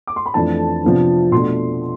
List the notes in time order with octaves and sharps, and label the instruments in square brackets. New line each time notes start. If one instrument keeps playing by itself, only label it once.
[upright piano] D6
C6
B5
F2 E3 A3 D4 A5
C3 F3 B3 D4
B2 A3 D4 C6